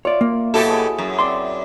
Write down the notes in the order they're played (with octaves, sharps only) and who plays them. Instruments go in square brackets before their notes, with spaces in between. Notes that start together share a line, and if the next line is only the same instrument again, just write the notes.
[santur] F4 E5 [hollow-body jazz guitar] C#5 D5
[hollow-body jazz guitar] A#3
[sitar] B2 G4 A4 [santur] F#3 E4
[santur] G#4 C#5 E5
[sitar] F#2
[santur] C4 D5 [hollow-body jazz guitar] C6